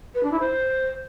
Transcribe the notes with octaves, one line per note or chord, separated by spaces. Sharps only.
B4
D4
E4
C5